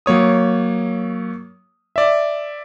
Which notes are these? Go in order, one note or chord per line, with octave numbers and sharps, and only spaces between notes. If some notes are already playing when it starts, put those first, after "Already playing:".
F#3 A#3 C#5 D#6
D5 E5